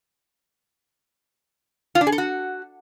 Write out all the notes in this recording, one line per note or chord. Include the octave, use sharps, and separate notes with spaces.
F4
D4
G#4
A4
F#4